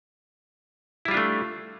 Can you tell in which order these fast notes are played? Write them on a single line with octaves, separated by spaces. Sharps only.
E4 G3 F4 D4 A3